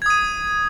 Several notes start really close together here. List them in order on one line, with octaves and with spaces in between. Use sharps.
G#6 D#6 D#7